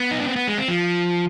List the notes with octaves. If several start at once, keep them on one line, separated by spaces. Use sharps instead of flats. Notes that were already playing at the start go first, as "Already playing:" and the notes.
Already playing: B3
D#4
D4
C4
B3
G#3
C4
F3